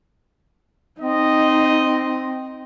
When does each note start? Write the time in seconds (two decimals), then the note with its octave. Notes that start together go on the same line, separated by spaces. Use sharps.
1.01 C4 D#4 D#5